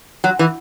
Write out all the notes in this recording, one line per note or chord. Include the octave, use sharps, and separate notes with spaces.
F#3
E3